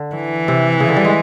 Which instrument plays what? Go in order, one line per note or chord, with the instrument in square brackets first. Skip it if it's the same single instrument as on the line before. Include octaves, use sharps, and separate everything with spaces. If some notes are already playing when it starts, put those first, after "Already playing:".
Already playing: [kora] D3
[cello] E3
[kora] C3
C#3
D3
G3
G#3